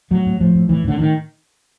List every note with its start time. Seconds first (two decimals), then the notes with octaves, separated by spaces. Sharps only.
0.11 A2 F#3
0.26 A2
0.40 A2 F3
0.55 A2
0.69 A2 E3
0.84 A2 D3
0.99 A2 D#3